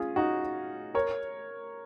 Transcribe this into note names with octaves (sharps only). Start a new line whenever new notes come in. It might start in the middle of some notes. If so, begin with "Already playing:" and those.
Already playing: C#4 F4 G#4
D#4 F#4
A#4 C#5